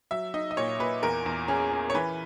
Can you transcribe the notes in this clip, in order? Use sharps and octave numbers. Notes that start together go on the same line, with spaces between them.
F#3 E5
D#4 D#5
D#5
A#2 C#5
A#2 B4
E2 A#4
E2
C#4 G#4
C#4
C#5
E3 B4